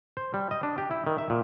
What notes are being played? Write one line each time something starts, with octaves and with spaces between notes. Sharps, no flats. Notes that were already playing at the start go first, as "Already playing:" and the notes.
C5
G3
D#5
D4
G4
E4
D#3
E5
A#2